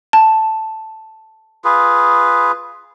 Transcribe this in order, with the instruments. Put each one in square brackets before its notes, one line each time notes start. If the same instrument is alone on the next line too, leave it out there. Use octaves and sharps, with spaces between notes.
[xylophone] A5
[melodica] F4 G#4 B4